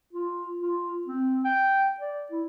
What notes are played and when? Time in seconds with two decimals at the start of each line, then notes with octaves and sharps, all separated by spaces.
0.13 F4
0.61 F4
1.07 C4
1.44 G5
2.00 D5
2.32 E4